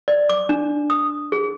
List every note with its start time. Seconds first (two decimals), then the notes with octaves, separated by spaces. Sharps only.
0.08 D5
0.29 D6
0.49 D4
0.90 D#6
1.32 G#4